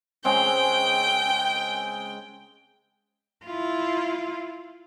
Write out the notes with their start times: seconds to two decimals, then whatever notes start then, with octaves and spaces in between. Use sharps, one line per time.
0.25 C#3 G#3 C4 G5
3.46 E4 F4